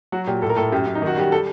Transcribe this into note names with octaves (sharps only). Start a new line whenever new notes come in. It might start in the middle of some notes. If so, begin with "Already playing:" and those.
F#3 F#4
A#2 G4
A2 A4
A#4
A2 A4
F#2 G4
F#2
D#4
D#3
F#4
G3 G4
G3 A4